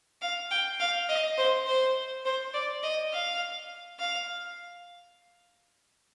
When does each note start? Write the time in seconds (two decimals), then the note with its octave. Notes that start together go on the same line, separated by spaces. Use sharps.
0.22 F5
0.51 G5
0.80 F5
1.09 D#5
1.38 C5
1.67 C5
2.25 C5
2.54 D5
2.83 D#5
3.13 F5
3.99 F5